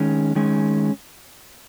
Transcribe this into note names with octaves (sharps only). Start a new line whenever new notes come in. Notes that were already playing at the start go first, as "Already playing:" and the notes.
Already playing: D#3 G#3 C#4
D#3 G#3 C#4